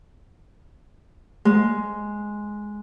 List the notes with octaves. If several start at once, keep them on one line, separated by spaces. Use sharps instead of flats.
G#3